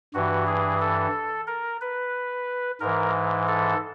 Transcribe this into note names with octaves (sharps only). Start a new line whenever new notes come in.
G2 E3 F#4
G#4
A4
A#4
B4
G#2 E3 A#4
A4